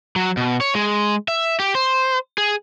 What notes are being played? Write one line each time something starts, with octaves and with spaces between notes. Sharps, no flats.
F#3
B2
C#5
G#3
E5
G4
C5
G#4